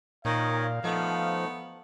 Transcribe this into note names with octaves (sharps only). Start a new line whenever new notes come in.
A#2 D#3 C#5 D#5 F5
F3 A3 B3 D#4